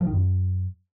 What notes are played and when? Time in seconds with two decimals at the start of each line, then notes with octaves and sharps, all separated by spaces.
0.01 F3
0.07 D#3
0.13 F#2